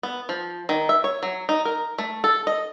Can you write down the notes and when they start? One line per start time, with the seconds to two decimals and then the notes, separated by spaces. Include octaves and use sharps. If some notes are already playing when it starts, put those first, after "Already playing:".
0.03 B3
0.29 F3
0.69 D#3
0.89 E5
1.04 C#5
1.23 F#3
1.49 D#4
1.65 A#4
1.98 A3
2.24 A4
2.47 D#5